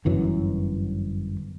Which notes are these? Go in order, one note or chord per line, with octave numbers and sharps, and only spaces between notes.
G1 F#2 E3 F#3